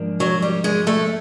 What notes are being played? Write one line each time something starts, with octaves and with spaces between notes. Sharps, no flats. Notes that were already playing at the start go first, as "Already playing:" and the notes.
Already playing: G#2 F3 A#3 D4
F#3
G3
G#3
A3